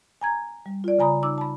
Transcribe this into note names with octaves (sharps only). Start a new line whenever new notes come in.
G#5 A#5 G#6
G3
F4 D5
C#3 G#5 A#5 B5 D#6
D#4 D6 E6
A5 B5